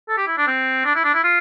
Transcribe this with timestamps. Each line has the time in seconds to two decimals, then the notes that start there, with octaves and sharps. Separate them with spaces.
0.09 A4
0.18 G4
0.27 E4
0.37 D4
0.47 C4
0.85 D4
0.95 E4
1.04 D4
1.14 E4
1.24 F4